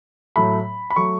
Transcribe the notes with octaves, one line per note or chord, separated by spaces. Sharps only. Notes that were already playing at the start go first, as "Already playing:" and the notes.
A2 F#3 A3 B5
B5
F#3 A3 C#6